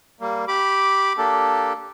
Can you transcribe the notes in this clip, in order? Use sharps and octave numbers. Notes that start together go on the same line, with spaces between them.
G3 A#3
G4 B5 D6
A#3 D4 G4 A4